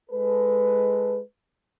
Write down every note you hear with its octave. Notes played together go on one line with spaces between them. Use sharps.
G#3 A4 B4